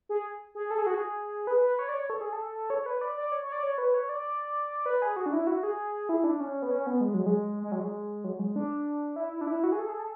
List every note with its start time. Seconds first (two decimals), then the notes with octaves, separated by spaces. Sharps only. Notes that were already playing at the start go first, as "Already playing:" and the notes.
0.09 G#4
0.55 G#4
0.71 A4
0.78 G#4
0.86 F#4
0.94 G#4
1.47 B4
1.63 B4
1.79 C#5
1.89 D5
1.94 C#5
2.10 A4
2.21 G#4
2.33 A4
2.70 C#5
2.82 C#5
2.86 B4
3.01 D5
3.17 D5
3.32 C#5
3.43 C#5
3.52 D5
3.63 C#5
3.78 B4
3.94 C#5
4.09 D5
4.86 B4
5.02 G#4
5.16 F#4
5.26 D4
5.33 E4
5.47 F#4
5.63 G#4
6.09 E4
6.24 D4
6.40 C#4
6.62 B3
6.71 C#4
6.87 B3
7.01 G#3
7.14 F#3
7.26 G#3
7.63 G#3
7.72 F#3
7.81 G#3
8.24 F#3
8.39 G#3
8.56 D4
9.16 E4
9.33 E4
9.41 D4
9.47 E4
9.64 F#4
9.72 G#4
9.79 A4
9.89 G#4
9.99 A4